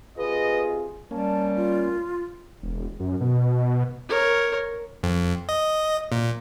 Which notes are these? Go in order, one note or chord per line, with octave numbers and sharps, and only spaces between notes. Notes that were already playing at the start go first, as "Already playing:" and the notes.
C3 F4 G#4 B4 D#5
G3 A#3 C#4 A5
F4
E1
F#2
B2
A#4 C#5
F2
D#5
A#2